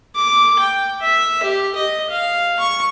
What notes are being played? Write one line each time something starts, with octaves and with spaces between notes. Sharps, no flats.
D6
G5
E5
G4
D#5
F5
C#6